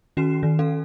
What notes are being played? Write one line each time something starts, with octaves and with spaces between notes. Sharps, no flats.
D#3 C#4 F#4 C7 E7
D#3
C#4 A4 F5